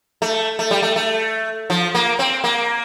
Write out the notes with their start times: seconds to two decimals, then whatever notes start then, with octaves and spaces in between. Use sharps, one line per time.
0.22 A3
0.59 A3
0.71 G3
0.82 A3
0.96 A3
1.70 F3
1.95 A#3
2.19 C4
2.44 A#3